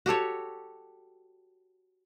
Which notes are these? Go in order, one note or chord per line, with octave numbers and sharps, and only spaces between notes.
F#4 G4 A4 C#5